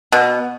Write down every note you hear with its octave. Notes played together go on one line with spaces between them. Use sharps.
B2